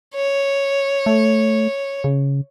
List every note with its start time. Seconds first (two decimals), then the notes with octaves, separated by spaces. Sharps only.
0.15 C#5
1.06 A3
2.04 C#3